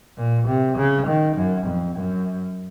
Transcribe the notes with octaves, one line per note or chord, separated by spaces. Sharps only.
A#2
C3
C#3
D#3
F#2
F2
F#2